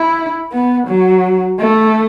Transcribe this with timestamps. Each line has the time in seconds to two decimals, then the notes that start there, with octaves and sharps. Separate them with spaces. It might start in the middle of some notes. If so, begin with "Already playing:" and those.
Already playing: E4
0.52 B3
0.88 F#3
1.59 A3